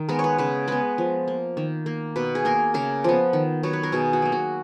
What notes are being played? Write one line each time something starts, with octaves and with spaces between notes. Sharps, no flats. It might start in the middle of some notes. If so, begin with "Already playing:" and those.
Already playing: D#3
G#3 B3 A#4
C#5
B4
C#3 B4
G#3 B3 B4
F3
A#3
D#3
A#3
B2 B4
G#4
A#3 A#4
C#3 A#4
F3 B3
D#3
F#3 B3 C#5
B4
A#4
B2 G#4
F#4
F#3 A#3
F#4